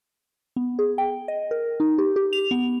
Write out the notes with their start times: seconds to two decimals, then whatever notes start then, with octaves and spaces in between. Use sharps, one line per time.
0.56 B3
0.79 G#4
0.98 G5
1.28 D#5
1.51 A#4
1.80 D#4
1.98 G4
2.16 G4
2.33 F7
2.51 B3